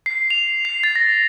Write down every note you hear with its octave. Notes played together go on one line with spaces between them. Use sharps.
C7
F7
C7
A6
A#6